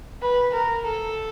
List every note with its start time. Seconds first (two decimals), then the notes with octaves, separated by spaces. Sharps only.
0.22 B4
0.54 A#4
0.87 A4